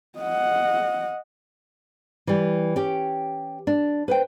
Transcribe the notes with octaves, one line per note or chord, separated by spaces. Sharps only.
D#5 F#5
E3 G3
C#4 G4
D4
B4 C5 G5